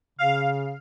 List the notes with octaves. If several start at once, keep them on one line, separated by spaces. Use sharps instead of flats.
C#3 F5